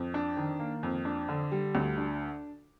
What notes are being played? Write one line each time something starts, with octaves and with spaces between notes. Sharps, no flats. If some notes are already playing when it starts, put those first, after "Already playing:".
Already playing: F2
D4
D#3
A#3
F2
D4
D3
G3
D2
D4